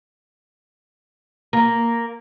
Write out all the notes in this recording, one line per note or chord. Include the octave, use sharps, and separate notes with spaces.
A#3